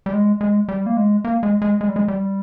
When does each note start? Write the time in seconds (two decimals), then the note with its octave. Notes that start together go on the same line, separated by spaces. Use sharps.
0.06 G3
0.13 G#3
0.41 G#3
0.68 G3
0.86 A#3
0.97 G#3
1.24 A#3
1.43 G#3
1.62 G#3
1.81 G#3
1.89 G3
1.96 G#3
2.08 G3